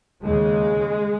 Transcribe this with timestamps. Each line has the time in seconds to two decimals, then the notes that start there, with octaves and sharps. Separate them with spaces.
0.24 D#2 C#3 G#3